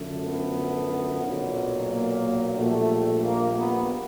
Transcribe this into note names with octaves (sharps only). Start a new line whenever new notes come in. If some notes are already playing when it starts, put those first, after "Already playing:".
Already playing: F#2 D3 F3 A3
B3
B1 A#2 F#3
A#3
A#1 A#2 G3 A3
A#3
B3